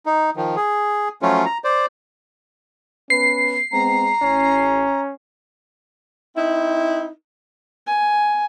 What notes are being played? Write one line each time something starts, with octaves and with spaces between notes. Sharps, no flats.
D#4
D#3 F3
G#4
F3 F#3 A3 C#4 F4
A#5
C5 D5
B3 C#4 B4 C7
G#3 B3 C4 A#5
A1 C#4
C4 D#4 E4
G#5